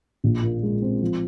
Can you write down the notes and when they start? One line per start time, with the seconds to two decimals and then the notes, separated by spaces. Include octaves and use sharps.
0.24 A#1
0.43 A#2
0.63 G#3
0.82 C4
1.01 F3